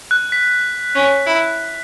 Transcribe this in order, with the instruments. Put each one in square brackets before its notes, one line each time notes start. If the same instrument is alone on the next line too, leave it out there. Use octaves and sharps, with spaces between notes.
[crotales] F#6
B6
[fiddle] C#4
E4